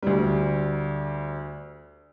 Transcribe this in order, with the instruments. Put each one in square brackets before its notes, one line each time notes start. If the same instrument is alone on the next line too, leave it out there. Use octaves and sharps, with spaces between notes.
[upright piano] D2 G3